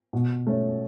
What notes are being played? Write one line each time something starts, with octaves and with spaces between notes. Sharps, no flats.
B2
A3 C#4